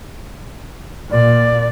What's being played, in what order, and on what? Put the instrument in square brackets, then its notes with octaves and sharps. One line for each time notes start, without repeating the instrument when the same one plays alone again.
[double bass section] A#2 [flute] D5